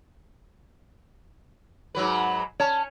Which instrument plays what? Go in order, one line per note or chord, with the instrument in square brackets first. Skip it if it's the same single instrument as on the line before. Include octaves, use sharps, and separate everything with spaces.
[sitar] G#2 F#3 B4
[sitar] C#4 [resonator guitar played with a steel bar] C#5 A5